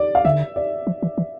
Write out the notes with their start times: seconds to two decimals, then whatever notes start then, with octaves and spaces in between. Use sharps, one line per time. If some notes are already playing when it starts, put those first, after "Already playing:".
Already playing: D5
0.15 F5
0.25 D3 E5
0.56 D5
0.87 F3
1.02 E3
1.18 E3